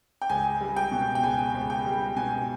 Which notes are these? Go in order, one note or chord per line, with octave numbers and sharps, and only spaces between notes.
G5
C#2 G#5
G3
G5
B2
G5
C#2 G#5
C#2
G5
G3
B2 G#5